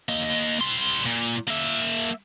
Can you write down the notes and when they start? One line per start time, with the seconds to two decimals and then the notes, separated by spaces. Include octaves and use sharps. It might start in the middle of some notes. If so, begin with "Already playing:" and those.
0.09 A#3 D#5
0.60 G3 C6
1.06 A#2
1.48 A#3 E5